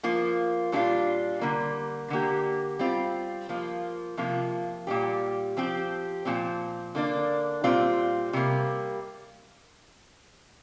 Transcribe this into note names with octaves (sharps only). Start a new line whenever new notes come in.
F3 A#3 F4
A#2 G3 D4 F4
D3 G3 A#3
D3 A#3 G4
G3 C4 F4
F3 A#3 F4
C3 F3 A#3 F4
A#2 G3 C4 G4
F3 C4 G4
A#2 F3 C4
D3 A#3 D4
A#2 G3 C4 F4
C3 G3 A#3